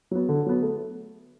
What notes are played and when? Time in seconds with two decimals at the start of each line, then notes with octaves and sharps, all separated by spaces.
0.11 F#3 B3
0.29 D3
0.46 F#3 B3
0.63 A3